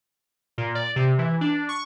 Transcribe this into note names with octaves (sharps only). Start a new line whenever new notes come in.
A#2
D5
C3
E3
D4
C#6